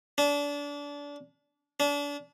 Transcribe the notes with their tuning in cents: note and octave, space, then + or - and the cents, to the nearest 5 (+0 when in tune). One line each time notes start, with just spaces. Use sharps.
D4 -30
D4 -35